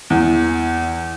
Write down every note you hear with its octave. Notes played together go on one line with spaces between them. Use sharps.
E2